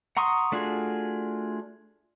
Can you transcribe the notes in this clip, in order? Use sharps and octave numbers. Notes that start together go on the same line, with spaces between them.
F#5 A#5 C6 C#6 D#6
A3 D4 F4 F#4 G#4